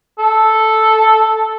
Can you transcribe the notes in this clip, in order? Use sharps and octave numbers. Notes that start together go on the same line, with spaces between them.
A4